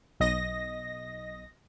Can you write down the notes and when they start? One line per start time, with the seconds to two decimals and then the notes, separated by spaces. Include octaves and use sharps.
0.20 B1 D#5 A#6